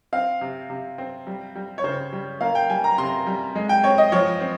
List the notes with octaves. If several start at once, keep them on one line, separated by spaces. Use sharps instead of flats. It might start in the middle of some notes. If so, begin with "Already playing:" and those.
C4 F5
C3
C3
C4
G3
G3
C#5
C#3 C5
G3
A#3 F5
G5
G3 G#5
A#5
C3 C6
G3
G#3
G5
C4 C#5
D#5
F3 C#5
C4